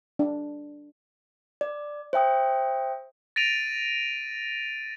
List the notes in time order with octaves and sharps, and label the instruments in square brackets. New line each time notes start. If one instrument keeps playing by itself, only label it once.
[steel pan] D4
[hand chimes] D5
C5 E5 G5 D#6
[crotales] A6 A#6 D7 D#7 F7